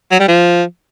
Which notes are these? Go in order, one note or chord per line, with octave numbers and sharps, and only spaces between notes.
F#3
G3
F3